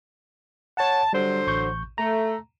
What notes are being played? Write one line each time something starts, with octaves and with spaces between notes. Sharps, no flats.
C#5 F#5 A5
D3 F#3 G3 C5
A1 C#6 G6
A3 A#5